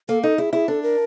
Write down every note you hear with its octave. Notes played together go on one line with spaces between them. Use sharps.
A#3 A4
D#4 A4
E4 G#4
E4 G#4
D4 A4
A#4